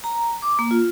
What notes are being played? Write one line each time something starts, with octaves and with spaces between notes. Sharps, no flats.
A#5
D6
A#3
F4